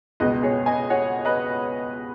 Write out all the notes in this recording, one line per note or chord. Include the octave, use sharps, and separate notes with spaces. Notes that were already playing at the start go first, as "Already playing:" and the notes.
C#2 B2 B4 D#5
G#4 C#5
D#5 G#5
C#5 F#5
B4 D#5